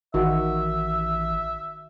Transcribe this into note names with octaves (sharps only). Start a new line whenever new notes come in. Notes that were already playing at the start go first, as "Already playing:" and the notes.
A1 D#3 F#4 E5